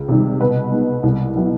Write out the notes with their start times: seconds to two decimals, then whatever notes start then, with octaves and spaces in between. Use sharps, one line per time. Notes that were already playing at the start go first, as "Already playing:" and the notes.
Already playing: C#2
0.08 C3 D#3 G3
0.40 B2 B4
0.72 G#3 B3 D#4
1.03 C2
1.35 B2 F#3 B3 E4